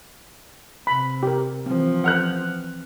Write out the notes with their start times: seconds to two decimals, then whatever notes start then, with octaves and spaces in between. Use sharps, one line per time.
0.87 C3 B5
1.23 G4 A#4
1.66 E3 F3 C4
2.04 F#5 F6 F#6